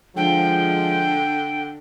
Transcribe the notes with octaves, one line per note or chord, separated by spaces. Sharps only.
D3 F3 G#3 G5